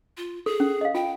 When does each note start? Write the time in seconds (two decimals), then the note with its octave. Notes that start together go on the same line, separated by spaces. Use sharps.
0.17 F4
0.46 G#4 A4
0.60 C#4
0.81 D#5 F5
0.95 F4 G5